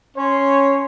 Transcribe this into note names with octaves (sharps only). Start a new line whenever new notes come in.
C#4 C#5 C6